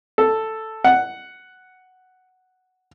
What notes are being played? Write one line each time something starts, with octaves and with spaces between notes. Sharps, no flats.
A4
F#5